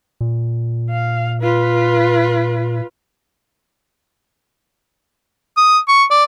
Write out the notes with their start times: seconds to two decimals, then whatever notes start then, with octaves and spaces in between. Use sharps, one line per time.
0.21 A#2
0.90 F5
1.42 F4 B4
5.57 D#6
5.88 C#6
6.11 D5